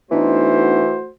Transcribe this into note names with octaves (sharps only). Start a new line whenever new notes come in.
E3 A3 B3 D4 D#4 F#4 C5